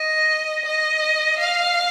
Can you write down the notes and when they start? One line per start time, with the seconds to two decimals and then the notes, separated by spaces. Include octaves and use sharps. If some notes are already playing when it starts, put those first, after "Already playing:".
Already playing: D#5
0.65 D#5
1.39 F5